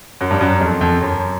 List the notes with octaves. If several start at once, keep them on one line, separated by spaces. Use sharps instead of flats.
F#2
G2
F#2
F2
F2
F#2